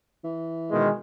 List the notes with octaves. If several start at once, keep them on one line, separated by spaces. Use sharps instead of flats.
E3
B2 D#3 G#3